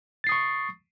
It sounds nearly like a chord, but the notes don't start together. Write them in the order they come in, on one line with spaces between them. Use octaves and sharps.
A6 C7 D#6 C#6